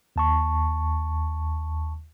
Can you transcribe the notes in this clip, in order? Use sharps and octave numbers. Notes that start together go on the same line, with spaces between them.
D#2 A5 C#6